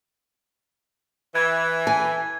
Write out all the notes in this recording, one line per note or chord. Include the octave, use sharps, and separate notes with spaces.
E3 G#6
G#5